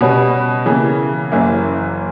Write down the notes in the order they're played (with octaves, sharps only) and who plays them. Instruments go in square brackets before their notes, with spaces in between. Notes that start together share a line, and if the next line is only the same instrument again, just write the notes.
[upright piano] B2 G3 C#4 F#4 B4
C#3 E3 A#3
F#1 F#2 E3 A#3 E4